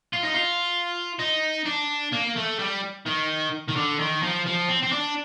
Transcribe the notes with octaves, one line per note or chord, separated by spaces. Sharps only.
F4
D#4
F4
D#4
D4
A#3
A3
G3
D#3
D#3
D3
D#3
F3
F3
C4
C4
D4